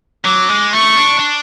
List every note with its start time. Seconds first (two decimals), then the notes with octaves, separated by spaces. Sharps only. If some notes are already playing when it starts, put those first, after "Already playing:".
0.24 F#3 D6
0.49 G#3
0.73 A3 C#6
0.96 D4
1.19 D4